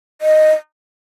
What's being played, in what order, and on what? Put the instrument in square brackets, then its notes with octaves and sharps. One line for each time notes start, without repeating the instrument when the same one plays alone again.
[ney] D#5